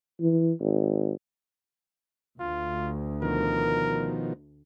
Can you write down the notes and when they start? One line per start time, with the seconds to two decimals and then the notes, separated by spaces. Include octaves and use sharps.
0.21 E3
0.60 G#1
2.40 D2 F4
3.22 B2 D#3 F3 A#4